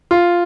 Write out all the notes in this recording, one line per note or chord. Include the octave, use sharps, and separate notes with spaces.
F4